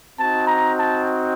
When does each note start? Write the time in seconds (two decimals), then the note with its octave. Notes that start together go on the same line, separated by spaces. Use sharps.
0.18 C4 D#4 F#4 A5
0.47 A#5
0.76 A5